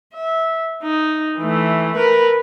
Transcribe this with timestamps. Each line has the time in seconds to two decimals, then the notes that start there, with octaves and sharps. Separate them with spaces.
0.14 E5
0.83 D#4
1.40 E3 A3
1.96 A#4 B4